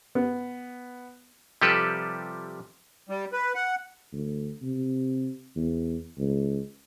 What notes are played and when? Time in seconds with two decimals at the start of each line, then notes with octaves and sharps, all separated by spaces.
0.15 B3
1.61 C3 F3 G3 G4 A4 B4
3.09 G3
3.32 B4
3.55 F#5
4.13 D2
4.62 C3
5.56 E2
6.18 C#2